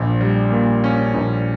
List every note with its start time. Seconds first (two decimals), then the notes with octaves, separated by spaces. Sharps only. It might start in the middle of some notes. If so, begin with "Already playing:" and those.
Already playing: A#1
0.21 G3
0.51 A#2
0.84 C#4
1.14 A#1